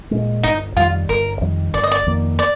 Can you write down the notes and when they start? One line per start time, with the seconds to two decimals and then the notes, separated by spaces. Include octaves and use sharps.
0.11 A#2 G#3
0.43 G1 D#4
0.76 F2 D#3 G3 F4
1.09 G1 A#4
1.41 F2 D#3 G3
1.74 G1 D5
1.83 D#5
1.92 D5
2.06 F2 D#3 A#3
2.39 D5